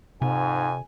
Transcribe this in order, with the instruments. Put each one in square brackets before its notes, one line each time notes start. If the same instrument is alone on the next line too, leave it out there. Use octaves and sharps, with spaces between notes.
[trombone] F2 [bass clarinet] G#2 [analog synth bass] C3 [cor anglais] G#5